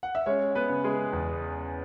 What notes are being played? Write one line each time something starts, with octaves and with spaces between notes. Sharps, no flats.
F#5
E5
G#3 C#4 C#5
B3 B4
C#3
G#3 G#4
E2